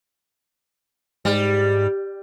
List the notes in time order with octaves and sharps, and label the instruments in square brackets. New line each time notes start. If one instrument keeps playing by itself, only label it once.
[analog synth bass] G#2 [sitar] G3